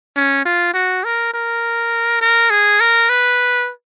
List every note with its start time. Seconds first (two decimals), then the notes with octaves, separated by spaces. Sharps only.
0.16 C#4
0.45 F4
0.74 F#4
1.04 A#4
1.34 A#4
2.21 A#4
2.50 G#4
2.80 A#4
3.09 B4